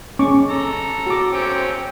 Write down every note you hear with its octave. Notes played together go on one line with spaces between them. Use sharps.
C#4 C#6 D6
A4 A#5
F#4 D6
C4 C#4 G5